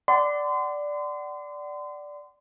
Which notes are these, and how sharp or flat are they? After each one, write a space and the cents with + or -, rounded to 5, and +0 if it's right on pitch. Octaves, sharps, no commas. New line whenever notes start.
D5 +0 F#5 +30 C6 -35